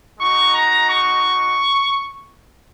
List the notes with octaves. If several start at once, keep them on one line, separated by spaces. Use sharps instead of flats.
G#3 D#4 F#4 C#6
A#5
C#6